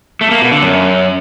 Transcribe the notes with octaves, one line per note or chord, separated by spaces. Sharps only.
A3
A#3
B2
D3
F#2